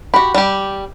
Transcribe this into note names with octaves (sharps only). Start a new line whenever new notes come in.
F#4 G4 B5
G3 G4